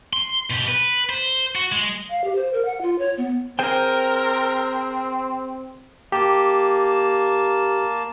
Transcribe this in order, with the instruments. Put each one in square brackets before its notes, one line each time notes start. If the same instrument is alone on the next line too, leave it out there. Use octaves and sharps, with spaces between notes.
[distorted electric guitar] C6
B2 G4
B4
C5
F#4
G#3
[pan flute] F5
G4
C5
A#4
F#5
F4
C#5
B3
[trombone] C4 [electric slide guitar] G#4 C5 G5 [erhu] A#4
[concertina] A#3 A5 [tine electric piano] G4